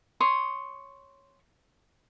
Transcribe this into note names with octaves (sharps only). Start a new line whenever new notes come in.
C#5 C6 D#6